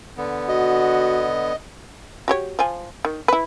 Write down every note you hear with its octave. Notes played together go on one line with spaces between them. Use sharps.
D3 B3
F#4 D#5
F#4 G4 C#5
F3 G#5
D#3
E4 B4